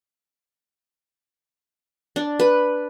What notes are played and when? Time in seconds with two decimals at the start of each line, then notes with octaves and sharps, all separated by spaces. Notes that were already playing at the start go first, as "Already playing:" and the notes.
2.16 D4
2.40 B4